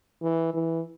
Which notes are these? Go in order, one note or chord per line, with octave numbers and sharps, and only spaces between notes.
E3
E3